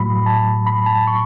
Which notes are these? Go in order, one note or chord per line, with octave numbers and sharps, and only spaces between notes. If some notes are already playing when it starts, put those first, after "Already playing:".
Already playing: A2 F#3 B5
A5
B5
A5
C#6